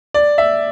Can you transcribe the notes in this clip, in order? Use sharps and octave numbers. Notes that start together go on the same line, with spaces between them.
D5
E5